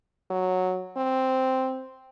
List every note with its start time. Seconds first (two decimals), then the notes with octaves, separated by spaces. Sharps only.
0.31 F#3
0.97 C4